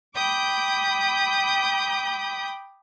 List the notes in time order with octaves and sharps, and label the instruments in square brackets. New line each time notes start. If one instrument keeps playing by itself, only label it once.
[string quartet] G5 B5 D6 D#6 G6